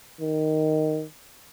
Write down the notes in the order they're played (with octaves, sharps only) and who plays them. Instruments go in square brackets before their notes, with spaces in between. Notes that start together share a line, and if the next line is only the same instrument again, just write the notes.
[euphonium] D#3